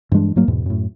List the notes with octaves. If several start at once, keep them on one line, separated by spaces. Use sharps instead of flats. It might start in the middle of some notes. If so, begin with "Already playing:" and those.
G2 E3 G#3 D4
G#2 F#3 A#3
E2 G#2 B2
F#2 A2